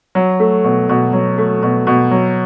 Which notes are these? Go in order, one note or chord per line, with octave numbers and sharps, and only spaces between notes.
F#3
A3
B2
B2
F#3
A3
B2
B2
F#3